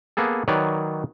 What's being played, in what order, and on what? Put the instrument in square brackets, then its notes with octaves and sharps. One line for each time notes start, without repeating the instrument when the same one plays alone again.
[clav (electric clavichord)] A#3 B3 G#4 A4
D#3 F#3 B4 C#5 D5